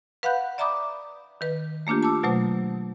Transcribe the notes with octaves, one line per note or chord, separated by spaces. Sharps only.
B4 F5 F#5 B5 F#6 G6
D5 E5 A#5 B5 D6 D#6
D#3 B4
A3 A#3 D4 F4 G4
A5 D6 E6
B2 F#3 A3 C5